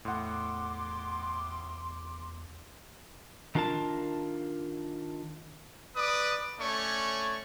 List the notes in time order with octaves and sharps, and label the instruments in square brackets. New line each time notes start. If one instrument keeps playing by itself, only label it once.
[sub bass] E2 [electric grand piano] A2 F#5 [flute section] C6 D6
[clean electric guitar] D#3 D4 F4 A#4 A5
[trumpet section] B4 D5 D6 D#6
A3 C#4 C#5 D5 C#6